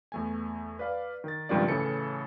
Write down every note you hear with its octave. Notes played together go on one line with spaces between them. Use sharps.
E2 A3 G#5
B4 D5 F5
D#3 A6
C#2 G2 C3 D#3 F3 D5
A2 C#3 E3 A4 C#7